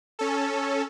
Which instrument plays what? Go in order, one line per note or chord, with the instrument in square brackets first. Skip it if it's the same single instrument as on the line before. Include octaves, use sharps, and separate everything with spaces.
[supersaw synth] C#4 A4